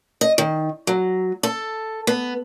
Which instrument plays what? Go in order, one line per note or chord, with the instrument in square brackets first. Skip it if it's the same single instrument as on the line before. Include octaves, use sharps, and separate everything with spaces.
[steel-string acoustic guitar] D#5
D#3
F#3
A4
B3